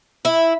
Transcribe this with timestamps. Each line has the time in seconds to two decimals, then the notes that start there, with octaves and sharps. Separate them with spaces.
0.25 E4